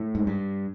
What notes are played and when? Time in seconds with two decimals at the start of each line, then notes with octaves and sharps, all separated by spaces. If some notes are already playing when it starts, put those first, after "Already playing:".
Already playing: A2
0.15 G#2
0.27 G2